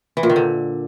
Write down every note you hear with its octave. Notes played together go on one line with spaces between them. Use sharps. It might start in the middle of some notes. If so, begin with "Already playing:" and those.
E3
A#2
D#3
D3